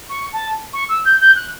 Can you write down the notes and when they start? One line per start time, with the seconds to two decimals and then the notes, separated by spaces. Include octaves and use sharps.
0.09 C#6
0.32 A5
0.73 C#6
0.88 E6
1.05 G6
1.20 G6
1.35 F#6